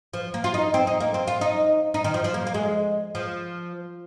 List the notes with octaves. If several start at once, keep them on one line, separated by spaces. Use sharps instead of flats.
F3
A#3
F4
D#4
C4
D#4
A#3
C4
F4
D#4
D#4
D#3
F3
F3
A#3
A#3
G#3
F3